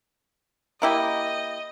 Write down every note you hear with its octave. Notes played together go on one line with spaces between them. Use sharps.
A#3 E4 G4 D#5